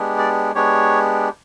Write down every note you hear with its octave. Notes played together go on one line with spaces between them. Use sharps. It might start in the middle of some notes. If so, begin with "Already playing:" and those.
Already playing: G#3 B3 D4 G4
D5
G#3 B3 D4 G4 C#5